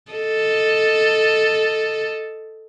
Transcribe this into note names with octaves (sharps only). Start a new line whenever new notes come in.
A4 D#5